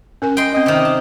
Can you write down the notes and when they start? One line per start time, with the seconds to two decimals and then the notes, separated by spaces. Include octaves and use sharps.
0.22 C#4 A#4 G#5
0.37 D#5 G5 C6
0.53 C4 C#4 D#5
0.66 C3 D#3
0.85 A5